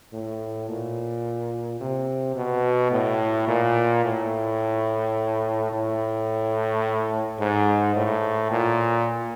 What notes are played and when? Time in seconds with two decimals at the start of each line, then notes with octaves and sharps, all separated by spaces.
0.13 A2
0.69 A#2
1.81 C3
2.36 B2
2.92 A2
3.48 A#2
4.05 A2
5.72 A2
7.40 G#2
7.96 A2
8.51 A#2